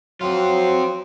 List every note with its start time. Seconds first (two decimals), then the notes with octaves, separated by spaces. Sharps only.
0.21 F#3 C4 F4